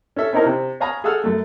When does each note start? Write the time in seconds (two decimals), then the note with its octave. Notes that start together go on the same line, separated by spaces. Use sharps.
0.16 C#4 A4 E5
0.33 C4 C#4 D#4 E4 A#4
0.46 C3
0.80 C#5 F5 G#5 A#5 B5 D#6
1.04 G#4 A4 F5 F#5 E6 F6
1.24 F#2 A3